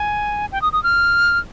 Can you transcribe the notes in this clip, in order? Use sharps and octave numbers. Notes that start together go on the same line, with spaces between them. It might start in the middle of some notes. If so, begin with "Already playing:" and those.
Already playing: G#5
G5
D#6
D#6
F6